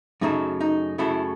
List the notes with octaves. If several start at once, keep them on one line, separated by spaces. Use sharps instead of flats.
F#2 C#3 F#3 A3 D#4
D#4
F#2 C#3 F#3 A3 E4